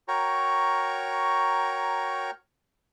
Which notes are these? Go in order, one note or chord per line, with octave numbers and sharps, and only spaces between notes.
F#4 A#4 C#5 G5 A#5 C#6